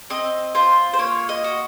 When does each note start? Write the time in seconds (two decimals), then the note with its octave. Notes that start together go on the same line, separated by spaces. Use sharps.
0.10 C4 D#5
0.55 F4 C5
0.93 C5
0.99 A#3 C#5
1.29 D#5
1.44 F#4